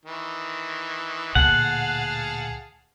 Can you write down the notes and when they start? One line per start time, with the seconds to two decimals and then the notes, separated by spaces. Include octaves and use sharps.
0.05 D#3 E3
1.35 D2 A#2 G#4 F5 F#5 A5